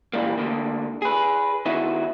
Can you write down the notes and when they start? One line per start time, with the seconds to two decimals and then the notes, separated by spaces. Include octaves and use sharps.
0.13 A#2 E3 G3 A#3
0.36 D2 D3 A#3
1.02 G#4 B4
1.66 D#3 B3 E4 F#4